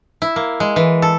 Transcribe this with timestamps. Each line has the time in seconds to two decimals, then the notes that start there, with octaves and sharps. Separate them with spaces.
0.22 E4
0.36 A#3
0.60 G#3
0.76 E3
1.02 A4